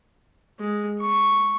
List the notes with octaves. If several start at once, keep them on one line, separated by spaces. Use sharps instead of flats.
G#3
C#6